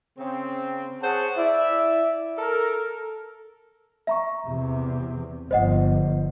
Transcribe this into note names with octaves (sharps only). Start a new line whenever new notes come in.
C#3 C4
G#4 C5 C#5 F#5 A5
E4 D5 E5
A4 A#4
E5 A#5 C#6
E2 C3
G1 F3 C5 D#5 F#5